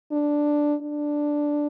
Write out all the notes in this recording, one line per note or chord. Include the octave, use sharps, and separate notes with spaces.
D4
D4